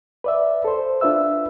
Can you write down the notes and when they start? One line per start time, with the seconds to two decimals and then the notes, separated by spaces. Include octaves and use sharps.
0.24 B4 D5 E5
0.65 A4 C5
1.01 D4 F4 B4 E5 E6